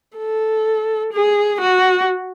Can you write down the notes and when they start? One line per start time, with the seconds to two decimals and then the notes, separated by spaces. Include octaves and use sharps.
0.17 A4
1.12 G#4
1.61 F#4